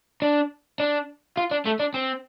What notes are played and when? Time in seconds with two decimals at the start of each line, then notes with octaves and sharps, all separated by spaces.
0.22 D4
0.80 D4
1.37 F4
1.51 D4
1.66 A3
1.80 D4
1.94 C4